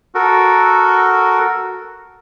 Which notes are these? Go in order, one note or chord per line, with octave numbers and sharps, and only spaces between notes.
F#4 A4 A#4